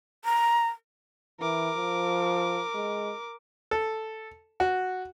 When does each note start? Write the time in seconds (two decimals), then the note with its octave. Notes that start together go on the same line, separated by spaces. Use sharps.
0.25 A#5
1.41 E3 A#4 D6
1.77 F3
2.75 G#3
3.71 A4
4.60 F#4